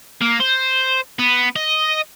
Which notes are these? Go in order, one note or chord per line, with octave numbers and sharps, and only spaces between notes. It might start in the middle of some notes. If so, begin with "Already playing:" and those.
A#3
C5
B3
D#5